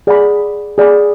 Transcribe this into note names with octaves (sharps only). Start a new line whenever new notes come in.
G#4 D5 F#5 B5
G#4 D5 F#5 B5